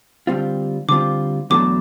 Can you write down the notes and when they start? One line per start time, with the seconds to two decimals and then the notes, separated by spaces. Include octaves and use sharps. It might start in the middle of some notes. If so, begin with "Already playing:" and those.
0.27 D3 G3 C4 F4
0.89 D3 G3 C4 F4 D6
1.50 E2 B2 F#3 A3 D4 D6